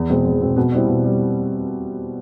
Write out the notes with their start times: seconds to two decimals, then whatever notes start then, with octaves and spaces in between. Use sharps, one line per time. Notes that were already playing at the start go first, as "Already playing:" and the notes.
Already playing: E2
0.10 B2 G#3 C4
0.25 E2
0.41 B2 G#3 C4
0.57 B2
0.72 G3 C4 E4
0.88 B2
1.04 G3